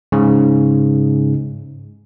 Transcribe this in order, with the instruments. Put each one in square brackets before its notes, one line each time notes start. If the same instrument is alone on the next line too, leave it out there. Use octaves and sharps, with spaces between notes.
[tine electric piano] G#2 C#3